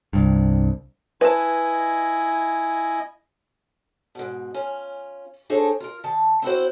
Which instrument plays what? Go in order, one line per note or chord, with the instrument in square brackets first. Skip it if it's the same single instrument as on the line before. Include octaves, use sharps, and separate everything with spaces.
[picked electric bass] C2 G2
[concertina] E4 D#5 G#5 [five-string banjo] B4 A5
[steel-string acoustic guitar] G#2 B2
C#4 F4
D4 D#4 G#4 A4 C5 C#5
F4 A#4
D#3 A5
C4 E4 F#4 C5